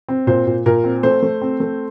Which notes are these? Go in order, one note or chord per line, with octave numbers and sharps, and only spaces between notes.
C4
A#2 C5
A#2
A#2 A#4
C4
A3 C5
A3
C4
A3